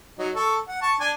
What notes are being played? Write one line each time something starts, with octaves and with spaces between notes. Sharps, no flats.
F#3 D#4
A4 C#6
F#5
A5 C#6
D4 G#5